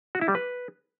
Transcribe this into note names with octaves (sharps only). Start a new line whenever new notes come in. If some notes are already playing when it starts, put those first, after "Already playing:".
F#4
E4
G3
B4